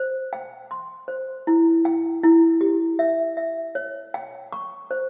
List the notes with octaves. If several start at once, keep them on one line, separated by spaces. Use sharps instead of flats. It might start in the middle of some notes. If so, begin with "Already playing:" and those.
Already playing: C5
G5
C6
C5
E4
G5
E4
G4
E5
E5
C#5
G5
C#6
C5